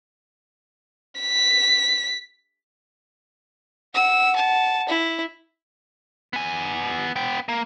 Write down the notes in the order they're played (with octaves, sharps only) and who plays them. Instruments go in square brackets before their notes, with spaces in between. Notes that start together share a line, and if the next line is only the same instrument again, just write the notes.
[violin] B6
[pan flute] F#5 [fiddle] E6
[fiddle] A5
E4
[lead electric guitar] B3 G#5
B3 G5
A#3